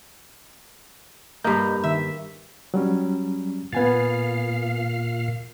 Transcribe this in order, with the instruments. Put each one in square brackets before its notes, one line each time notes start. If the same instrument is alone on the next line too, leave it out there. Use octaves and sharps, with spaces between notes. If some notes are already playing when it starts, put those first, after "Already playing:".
[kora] G2 A#3 [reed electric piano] D#5 A#5 G6
[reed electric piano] D#3 [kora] E5
[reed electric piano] F#3 G3 C#4
[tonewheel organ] A#2 F5 [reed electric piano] B3 G#5 A6